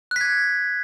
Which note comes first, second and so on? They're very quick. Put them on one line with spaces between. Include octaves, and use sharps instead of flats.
F#6 B6 G#6